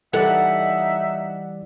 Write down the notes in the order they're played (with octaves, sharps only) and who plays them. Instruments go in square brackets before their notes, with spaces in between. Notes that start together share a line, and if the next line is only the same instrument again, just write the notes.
[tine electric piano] E3 G3 D5 [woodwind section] D#4 E5 [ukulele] A4 [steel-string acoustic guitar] F#5